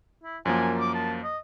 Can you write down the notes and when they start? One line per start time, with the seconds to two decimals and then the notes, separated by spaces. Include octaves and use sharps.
0.24 E4
0.45 F#2 F3 A#3 G#5
0.80 D6
0.94 A5
1.24 D#5